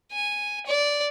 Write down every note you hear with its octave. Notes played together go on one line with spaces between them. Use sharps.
G#5
D5